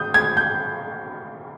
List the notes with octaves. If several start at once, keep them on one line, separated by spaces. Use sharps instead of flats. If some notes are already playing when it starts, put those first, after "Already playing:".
Already playing: D#6 G6
G#6
G6